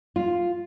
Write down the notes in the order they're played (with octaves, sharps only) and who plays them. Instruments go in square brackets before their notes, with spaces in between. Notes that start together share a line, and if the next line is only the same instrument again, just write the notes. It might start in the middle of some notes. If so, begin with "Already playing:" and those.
[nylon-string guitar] F4